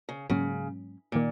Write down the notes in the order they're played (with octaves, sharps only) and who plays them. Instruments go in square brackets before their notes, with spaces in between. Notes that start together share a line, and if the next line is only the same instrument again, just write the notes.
[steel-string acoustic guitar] C#3
[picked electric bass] G#2 F#3 A#3 C#4 [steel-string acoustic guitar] C#3
[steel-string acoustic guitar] A#2 [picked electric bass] D#3 A#3